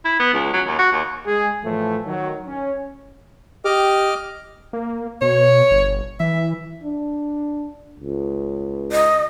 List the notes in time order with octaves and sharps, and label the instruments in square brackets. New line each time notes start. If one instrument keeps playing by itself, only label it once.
[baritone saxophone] E4
B3
C#2
F#3
D#2
F#4
D#2
[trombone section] G#3 G#4
A2 E3 F3 A3
D#3 F#3
C#4
[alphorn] G4 [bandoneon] D#5 D6 F6
[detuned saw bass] A#3
[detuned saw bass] B2 [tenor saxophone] C#5
[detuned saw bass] G1
[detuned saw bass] E3 [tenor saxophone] E5
[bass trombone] D4
C#2
[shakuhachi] D#5